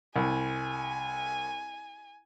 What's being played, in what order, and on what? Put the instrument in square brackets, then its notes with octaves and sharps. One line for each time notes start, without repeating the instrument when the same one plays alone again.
[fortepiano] C2 [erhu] G#5